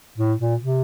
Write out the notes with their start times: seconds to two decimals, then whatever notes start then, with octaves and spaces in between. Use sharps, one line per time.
0.18 A2
0.40 A#2
0.61 C3